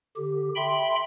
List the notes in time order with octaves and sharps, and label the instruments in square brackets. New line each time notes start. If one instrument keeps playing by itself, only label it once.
[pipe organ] D3 G4
E5 G5 B5 C6